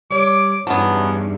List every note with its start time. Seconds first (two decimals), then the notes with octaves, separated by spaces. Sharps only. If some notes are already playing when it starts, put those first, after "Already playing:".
0.11 G3 C#5 D6
0.67 E2 G2 F#3 B3 C#4 D#4 A5